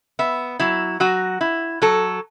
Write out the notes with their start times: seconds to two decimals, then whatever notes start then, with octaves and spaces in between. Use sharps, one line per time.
0.19 B3 E5
0.59 F#3 E4
1.00 F#3 F#4
1.41 E4
1.82 F#3 A4